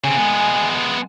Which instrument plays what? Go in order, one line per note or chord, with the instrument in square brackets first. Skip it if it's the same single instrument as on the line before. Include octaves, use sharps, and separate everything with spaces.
[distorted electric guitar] C#3 C4 [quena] G#5
[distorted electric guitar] G#3 B3